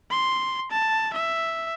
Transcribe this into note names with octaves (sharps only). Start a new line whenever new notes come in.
C6
A5
E5